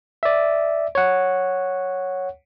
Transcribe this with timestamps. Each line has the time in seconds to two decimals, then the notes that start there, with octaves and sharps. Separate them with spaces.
0.23 D5 E5
0.95 C#5 F#5